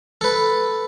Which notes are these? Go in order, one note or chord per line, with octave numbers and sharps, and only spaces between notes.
A4 B4